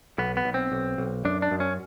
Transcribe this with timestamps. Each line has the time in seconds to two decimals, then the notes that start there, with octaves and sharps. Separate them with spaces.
0.18 B1 B3
0.37 B3
0.45 B1
0.54 C4
0.72 B1
0.98 B1
1.25 F#2 D4
1.42 D4
1.51 F#2
1.60 C#4